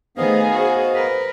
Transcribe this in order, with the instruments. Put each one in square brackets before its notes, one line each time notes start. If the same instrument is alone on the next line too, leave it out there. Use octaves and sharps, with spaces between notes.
[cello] D#3 A3 [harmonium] B3 D#5 F5 [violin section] G#4 [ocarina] C5
[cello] F#4 [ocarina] C5
[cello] A#4 B4